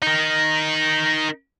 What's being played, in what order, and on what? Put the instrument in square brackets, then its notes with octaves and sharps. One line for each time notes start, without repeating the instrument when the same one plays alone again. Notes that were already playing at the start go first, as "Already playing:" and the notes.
[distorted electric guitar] D#4 A#4